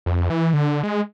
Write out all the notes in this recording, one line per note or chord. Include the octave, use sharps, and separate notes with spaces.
F2
E3
D3
G#3